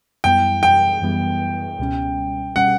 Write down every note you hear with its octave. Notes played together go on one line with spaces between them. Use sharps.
F#2 E3 G3 B3 E4 G5
G5
F#2 E3 G3 B3 E4
C#2 B2 G3 C#4
B2 G3 C#4 F#5